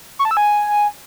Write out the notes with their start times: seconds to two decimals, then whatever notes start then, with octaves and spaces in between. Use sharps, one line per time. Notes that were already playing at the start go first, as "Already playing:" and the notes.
0.19 C#6
0.25 A5
0.31 E6
0.37 G#5